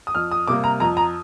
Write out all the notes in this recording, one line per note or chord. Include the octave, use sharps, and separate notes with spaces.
D#6
F2 F6
D#6
C3 G3 A#3 D6
A#5
F2 A#5
A#5